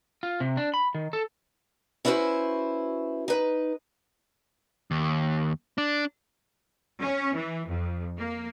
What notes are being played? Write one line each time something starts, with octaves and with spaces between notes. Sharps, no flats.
F4
C3
D4
B5
D#3
A4
C#4 E4 F#4 B4 C5
D#4 B4
D#2
D4
C#4
E3
F2
A#3